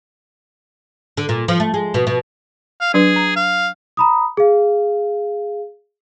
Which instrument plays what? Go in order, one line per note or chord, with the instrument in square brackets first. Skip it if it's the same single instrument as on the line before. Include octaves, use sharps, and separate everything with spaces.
[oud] D3
A#2
F3
A3
G#3
B2
B2
[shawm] F5
[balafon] F#3 D4 B4 [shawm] G#4
[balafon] A#5
[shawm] F5
[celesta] A#5 B5 D#6
G#4 F5